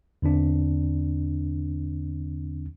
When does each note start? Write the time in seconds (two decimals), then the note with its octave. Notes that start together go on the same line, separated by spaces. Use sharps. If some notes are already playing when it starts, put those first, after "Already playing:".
0.22 E2 D3 C4 D4